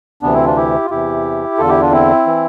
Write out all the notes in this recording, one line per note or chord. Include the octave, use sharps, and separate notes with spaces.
D2 C3 E3 B3 D4
C4 E4
D4 F4
E4 G4
F4
E2 C3 E3 E4 G4
E2 D3 F4 A4
E4 G4
D4 F4
C4 E4
E3